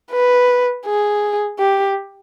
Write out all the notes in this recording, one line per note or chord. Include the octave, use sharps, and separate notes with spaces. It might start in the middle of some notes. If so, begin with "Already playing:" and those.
B4
G#4
G4